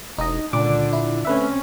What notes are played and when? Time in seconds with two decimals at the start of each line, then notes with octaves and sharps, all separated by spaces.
0.18 E1 D#4 D#5
0.53 C#2 A#2 D3 D4 D6
0.93 E4
1.25 A3 C4 C#4 B4 E5